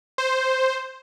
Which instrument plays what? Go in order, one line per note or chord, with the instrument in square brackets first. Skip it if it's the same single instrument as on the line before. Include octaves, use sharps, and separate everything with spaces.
[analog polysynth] C5